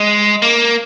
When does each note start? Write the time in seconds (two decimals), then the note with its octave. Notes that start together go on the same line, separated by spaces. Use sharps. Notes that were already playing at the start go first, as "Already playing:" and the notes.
Already playing: G#3
0.42 A#3